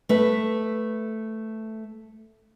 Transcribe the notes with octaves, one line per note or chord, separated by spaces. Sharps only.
A3 B4